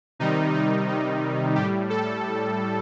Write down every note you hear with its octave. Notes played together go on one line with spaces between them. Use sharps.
C3 D#3 G3 D#4
D#4
D#4
A2 G3 G4
A4